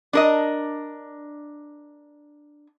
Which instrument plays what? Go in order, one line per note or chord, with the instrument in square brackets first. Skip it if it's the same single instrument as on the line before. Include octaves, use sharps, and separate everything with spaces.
[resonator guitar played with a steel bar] D4 A#4 D#5